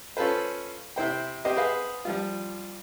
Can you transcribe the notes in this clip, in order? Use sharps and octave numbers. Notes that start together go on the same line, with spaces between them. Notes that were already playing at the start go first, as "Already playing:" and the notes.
C#4 F4 A4 B4 C5
C3 E4 C5 G5
C4 G4 C5 D#5
G#4 B4 C5 F5 F#5
F3 G3 F4